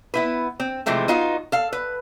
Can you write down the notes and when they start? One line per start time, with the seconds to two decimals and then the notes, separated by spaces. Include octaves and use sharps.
0.14 B3 E4 B4
0.60 C4
0.86 C3 E3 F3 G#3 A3 C4
1.08 B3 D#4 F4 F#4
1.52 A4 F5
1.73 B4